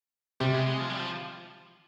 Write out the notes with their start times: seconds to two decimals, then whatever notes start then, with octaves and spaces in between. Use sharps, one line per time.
0.40 C3 G3
0.54 G#3
0.66 G#3
0.80 F3
0.90 G3
0.99 F3